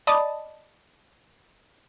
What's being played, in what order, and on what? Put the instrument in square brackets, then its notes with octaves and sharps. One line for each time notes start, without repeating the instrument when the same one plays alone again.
[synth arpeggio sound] D5 D#5 A5 B5 D#6